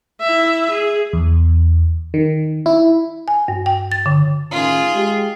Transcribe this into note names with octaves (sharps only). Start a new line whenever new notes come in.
E4 E5
G#4
E2
D#3
E4
G#5
G2
G5
A6
D3
A2 D#3 C#4 F4 G#4
G#3 G4